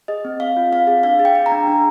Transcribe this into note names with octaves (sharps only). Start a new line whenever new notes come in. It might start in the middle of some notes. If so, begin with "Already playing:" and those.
G#4 D#5
C4
C4 F5
F4
C4 F5
G#4
D4 F5
G#4
G5
G#4
A#5
D4
D4